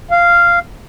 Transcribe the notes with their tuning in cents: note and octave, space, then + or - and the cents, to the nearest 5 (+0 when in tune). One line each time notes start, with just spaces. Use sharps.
F5 -10